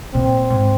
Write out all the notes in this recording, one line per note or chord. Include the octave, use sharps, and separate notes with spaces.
A#2 C4
G#2